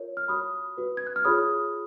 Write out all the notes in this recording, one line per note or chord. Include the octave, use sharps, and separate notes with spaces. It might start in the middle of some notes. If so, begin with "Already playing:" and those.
Already playing: F4 A#4 C#5
F6
F#4 C#5 B5 D#6
F#4 B4
G#6
F#6
F6
F4 G#4 C#5 B5 D#6